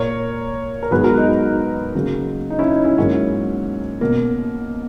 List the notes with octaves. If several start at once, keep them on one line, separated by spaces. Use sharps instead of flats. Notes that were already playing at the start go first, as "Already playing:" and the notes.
Already playing: A#2 A#3 A#4 C#5
A#4
G#2 F#3 B3 G#4 B4
F#4 A#4
D#4 F#4
D#4
C#3 F#3 A#3
D#4
C#4 E4
D#4
C#4 E4
G#2 F#3 A#3 C#4
B2 A#3